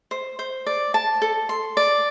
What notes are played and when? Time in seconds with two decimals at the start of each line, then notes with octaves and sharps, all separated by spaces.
0.11 C5
0.39 C5
0.67 D5
0.94 A5
1.22 A4
1.49 C6
1.77 D5